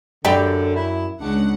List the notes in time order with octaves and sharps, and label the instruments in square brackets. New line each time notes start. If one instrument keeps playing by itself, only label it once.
[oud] F#2 G4 D5 [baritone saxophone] D3 [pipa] G5 B5
[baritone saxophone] E4
[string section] C#2 F#5 [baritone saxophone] D4